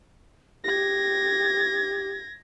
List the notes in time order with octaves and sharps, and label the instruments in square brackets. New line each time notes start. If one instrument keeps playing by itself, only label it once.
[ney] G4 [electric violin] G#6 A#6